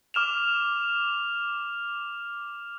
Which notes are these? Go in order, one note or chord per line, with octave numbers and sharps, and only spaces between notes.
D6 F6 E7 F7